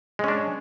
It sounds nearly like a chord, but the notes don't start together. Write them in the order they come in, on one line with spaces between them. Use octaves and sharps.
G#3 C#4 D4